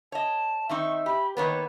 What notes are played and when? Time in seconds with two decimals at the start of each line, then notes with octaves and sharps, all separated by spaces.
0.12 C#5 D#5 A5
0.69 D#3 C4 D#4 E5 C#6
1.06 G4 B5
1.37 D#3 A#3 B3 B4 C#5